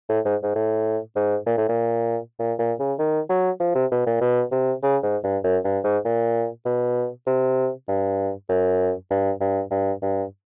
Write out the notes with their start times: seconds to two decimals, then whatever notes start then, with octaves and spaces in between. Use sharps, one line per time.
0.09 A2
0.25 G#2
0.43 G#2
0.55 A2
1.16 G#2
1.46 A#2
1.57 A2
1.69 A#2
2.39 A#2
2.59 A#2
2.79 C#3
2.99 D#3
3.29 F#3
3.60 F3
3.75 C3
3.91 B2
4.06 A#2
4.21 B2
4.52 C3
4.83 C#3
5.03 G#2
5.24 G2
5.44 F#2
5.65 G2
5.84 G#2
6.05 A#2
6.65 B2
7.27 C3
7.88 G2
8.49 F#2
9.10 G2
9.41 G2
9.71 G2
10.02 G2